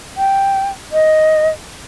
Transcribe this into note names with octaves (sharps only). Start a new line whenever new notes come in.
G5
D#5